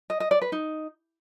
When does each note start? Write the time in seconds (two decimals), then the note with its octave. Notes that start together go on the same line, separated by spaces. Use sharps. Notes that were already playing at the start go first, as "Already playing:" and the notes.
0.10 D#5
0.20 D#5
0.31 D5
0.42 B4
0.52 D#4